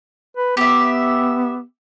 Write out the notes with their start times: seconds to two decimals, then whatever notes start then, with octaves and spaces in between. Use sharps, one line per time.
0.37 B4
0.57 B3 G4 E5